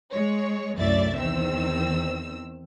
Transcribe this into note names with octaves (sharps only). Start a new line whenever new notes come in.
G#3 C#5
C2 F#2 A2 D5 E5 A6
E2 D#3 C4 E6